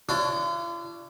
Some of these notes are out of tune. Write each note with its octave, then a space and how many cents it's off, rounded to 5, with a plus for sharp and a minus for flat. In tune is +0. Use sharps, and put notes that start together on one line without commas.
D4 +0 F4 -45 C#5 +0